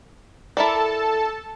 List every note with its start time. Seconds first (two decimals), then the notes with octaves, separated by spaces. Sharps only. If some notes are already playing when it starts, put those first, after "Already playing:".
0.57 E4 A4 A#4 D5 A5